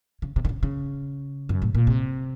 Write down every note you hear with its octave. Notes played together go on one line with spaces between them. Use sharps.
C#3
C3
D#3
C#3
C#3
F#2
A2
A#2
C3